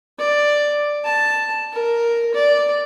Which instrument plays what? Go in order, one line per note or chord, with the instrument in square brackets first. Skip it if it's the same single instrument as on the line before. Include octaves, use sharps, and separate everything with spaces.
[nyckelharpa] D5
A5
A#4
D5